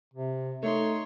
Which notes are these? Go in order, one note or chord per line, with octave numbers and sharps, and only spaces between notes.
C3
A3 D#4 C#5 C6